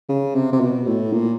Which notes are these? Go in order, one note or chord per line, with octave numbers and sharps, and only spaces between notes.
C#3
C3
C3
B2
A2
A#2